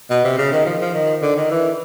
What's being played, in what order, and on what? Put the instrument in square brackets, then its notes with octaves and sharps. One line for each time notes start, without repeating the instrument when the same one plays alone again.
[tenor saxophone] B2
C3
C#3
D#3
F3
F3
D#3
D3
D#3
E3